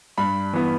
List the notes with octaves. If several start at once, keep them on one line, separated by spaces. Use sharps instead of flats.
G2 B5
E3 B3